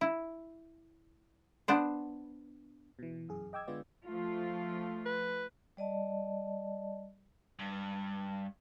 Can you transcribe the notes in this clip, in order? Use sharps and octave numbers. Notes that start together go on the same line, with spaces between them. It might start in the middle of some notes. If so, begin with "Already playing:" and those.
E4
B3 D4 C5
B2 E3
G1 F#2 G#4
D#5 G5 D6 E6 G#6
D3 G#3 B3 F4 D5
F3 A3 F4
B4
G3 D5 D#5 A5
G2